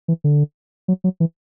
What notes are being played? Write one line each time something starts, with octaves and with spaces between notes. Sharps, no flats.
E3
D3
F#3
F#3
E3